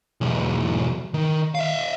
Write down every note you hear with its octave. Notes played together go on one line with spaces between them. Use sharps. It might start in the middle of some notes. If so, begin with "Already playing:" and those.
B1 E2
D#3
E5 F5